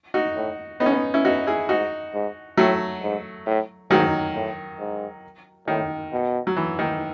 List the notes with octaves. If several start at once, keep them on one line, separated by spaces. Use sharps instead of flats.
D#4 F#4
A2
A2 B3 D#4
C#4
B3 D#4
C#4 E4
B2 D#4 F#4
E4 G#4
G#2 D#4 F#4
G#2
A2 F#3 A3
G#2
A2
G#2 D#3 F#3
A2
G#2
A2 D#3
B2
F#3
E3
D#3